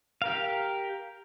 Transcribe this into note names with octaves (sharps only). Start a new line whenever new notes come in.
G4 A#4 F5